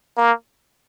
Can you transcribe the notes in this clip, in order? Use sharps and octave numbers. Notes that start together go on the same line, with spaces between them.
A#3